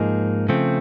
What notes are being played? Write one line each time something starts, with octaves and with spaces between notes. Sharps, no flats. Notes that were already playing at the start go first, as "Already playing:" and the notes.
Already playing: G#2 F3 A#3 D#4 G#4
C#3 F3 A3 C4